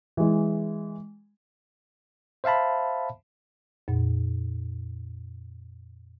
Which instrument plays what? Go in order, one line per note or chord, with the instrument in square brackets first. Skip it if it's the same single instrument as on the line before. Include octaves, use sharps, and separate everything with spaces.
[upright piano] E3 G#3
[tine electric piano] C5 E5 F5 A5 B5
[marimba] F2 A#2